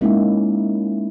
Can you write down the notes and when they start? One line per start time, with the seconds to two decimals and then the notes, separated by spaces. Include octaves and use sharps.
0.01 G#3 A#3 C#4 D#4 E4